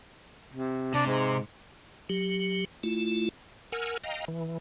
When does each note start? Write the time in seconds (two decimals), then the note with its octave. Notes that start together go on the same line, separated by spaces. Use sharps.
0.53 C3
0.94 C3 D4
1.07 G#2
2.09 F#3 G4
2.83 A3 E4 F4
3.72 A#4 F#5 G#5 E6 F6
4.04 D#5 F5 G5 A#5
4.28 E3